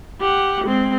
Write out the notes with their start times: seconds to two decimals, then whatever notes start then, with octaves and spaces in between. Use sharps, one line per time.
0.20 G4 F#5
0.65 G#3 C4